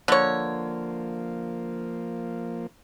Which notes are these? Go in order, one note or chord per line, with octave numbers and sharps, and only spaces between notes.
D3 F3 A#3 C#5